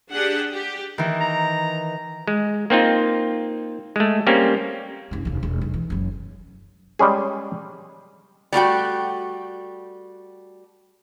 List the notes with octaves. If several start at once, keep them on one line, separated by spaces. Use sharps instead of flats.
D4 G4 G#4 F#5
G4
D#3 E3
A#5
G#3
A#3 C4 D#4 F4
G#3 A3
G3 A#3 C4 C#4
F#1 C3
F1 D#2
E1
B1
E3
F#1 F#3
G3 G#3 C#4 G#4
G3 A3 F#4 G5